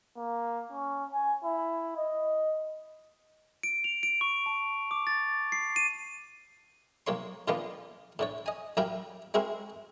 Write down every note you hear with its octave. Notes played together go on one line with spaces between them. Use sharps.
A#3
C#4
G#5
E4
D#5
D7
F7
D7
C#6
A5
D6
A6
C7
D#7
B1 A#3 C#5 C6
A#2 D3 D#3 F3 A#3 B3
A2 D3 C#5
D#5 G#5
A1 F#3 E4 A#4 F5 G5
G#3 C4 E4 F#4 A#4